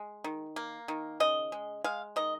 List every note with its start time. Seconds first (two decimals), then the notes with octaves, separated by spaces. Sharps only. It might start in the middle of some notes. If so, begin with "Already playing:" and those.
Already playing: G#3
0.24 D#3
0.56 A#3
0.88 D#3
1.20 C#3 D#5
1.52 G#3
1.84 G#3 F5
2.16 D#3 D#5